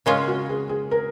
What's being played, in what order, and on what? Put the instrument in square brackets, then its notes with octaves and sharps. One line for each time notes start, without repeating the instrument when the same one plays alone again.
[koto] C#3 G#3 C#4 F4 [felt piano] A#4
[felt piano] F#4
G#4
G#4
A#4